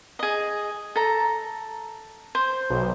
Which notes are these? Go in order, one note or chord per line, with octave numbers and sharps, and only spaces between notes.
G#4 D#5
A4 A#5
C5
B1